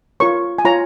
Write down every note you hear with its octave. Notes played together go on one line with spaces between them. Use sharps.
F4 A#4 C#5 C#6
G#5
F4 C#5 A#5